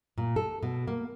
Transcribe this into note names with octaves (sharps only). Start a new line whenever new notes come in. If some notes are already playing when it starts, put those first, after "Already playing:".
A#2
A4
B2
A#3